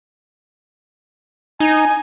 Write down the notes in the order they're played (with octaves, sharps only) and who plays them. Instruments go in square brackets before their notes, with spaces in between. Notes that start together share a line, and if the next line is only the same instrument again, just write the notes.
[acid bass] D#4 [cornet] G#5